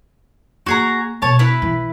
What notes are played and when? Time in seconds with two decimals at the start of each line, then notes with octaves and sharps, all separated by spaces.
0.66 A#3 F#4 G#4 A#5
1.22 B2 C#5 A5
1.39 E4 B4
1.62 E3